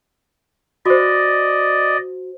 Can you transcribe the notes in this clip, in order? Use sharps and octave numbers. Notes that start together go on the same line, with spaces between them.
F#4 C5 D5 D#5